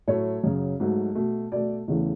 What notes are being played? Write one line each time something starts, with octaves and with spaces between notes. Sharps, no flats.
A2 F#3 A3 C#5
F#2 C#3 F#3
G#2 F#3 A3
B2 A3
B2 A3 D5
E2 C#3 E3 A3